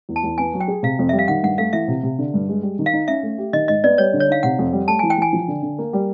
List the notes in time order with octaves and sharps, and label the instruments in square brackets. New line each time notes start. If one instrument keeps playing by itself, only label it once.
[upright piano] E2
[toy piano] A5
[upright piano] E2
[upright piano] B3 [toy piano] G#5
[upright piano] F#3
[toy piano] G5
[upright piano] G#4
[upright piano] C3 [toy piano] F5
[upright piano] F2
[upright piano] G3 [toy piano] E5
[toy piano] F5
[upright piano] D#3 [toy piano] F#5
[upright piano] G2 [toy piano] F#5
[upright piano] A3 [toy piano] F5
[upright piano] E3 [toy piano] E5
[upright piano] C3
C3
D3
G2
G#3
G3
D#3
[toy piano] F5
[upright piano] D#4
[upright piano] C#4 [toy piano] E5
[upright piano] A3
G4
[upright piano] D#3 [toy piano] D#5
[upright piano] G#2 [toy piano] D#5
[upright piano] B3 [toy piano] D5
[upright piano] G3 [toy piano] C#5
[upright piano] D3
[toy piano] C#5
[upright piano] D#4 [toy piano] F5
[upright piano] C3 [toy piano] F#5
[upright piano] F2
G3
[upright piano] A3 [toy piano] A5
[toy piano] G#5
[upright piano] E3
[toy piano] G5
[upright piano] E3 [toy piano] G#5
[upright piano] F3
D3
D3
A#3
G3